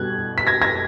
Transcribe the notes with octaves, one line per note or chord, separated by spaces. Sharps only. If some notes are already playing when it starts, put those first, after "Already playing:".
Already playing: B2 G3 F#6 G#6
B6
G#6 A#6
G#6 A#6